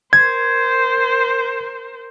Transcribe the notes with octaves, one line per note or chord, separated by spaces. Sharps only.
A#4 C5 G#6